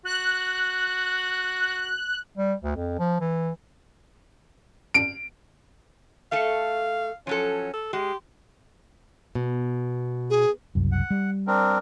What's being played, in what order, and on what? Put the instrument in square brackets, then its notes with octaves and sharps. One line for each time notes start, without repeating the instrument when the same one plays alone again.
[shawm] F#4 [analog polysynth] F#6
[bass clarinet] G3
D2
F2
F3
E3
[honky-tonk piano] D7
[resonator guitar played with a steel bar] A3 A4 [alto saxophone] F5
[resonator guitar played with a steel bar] F3 F#3 A4 [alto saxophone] C#4
[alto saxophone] A4
[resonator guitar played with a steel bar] G#3 [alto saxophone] G4
[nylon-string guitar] B2
[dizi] G#4
[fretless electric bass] F#1 C2 F#2
[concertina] F#5
[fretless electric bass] G3
[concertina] C4 D4 A#4